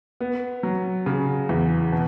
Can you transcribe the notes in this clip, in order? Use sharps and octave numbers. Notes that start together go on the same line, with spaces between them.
B3
F#3
C#3
E2
B2